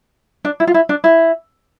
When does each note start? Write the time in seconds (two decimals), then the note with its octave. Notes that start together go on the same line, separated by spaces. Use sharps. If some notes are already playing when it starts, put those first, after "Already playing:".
0.45 D4
0.60 E4
0.67 F4
0.74 E4
0.89 D4
1.04 E4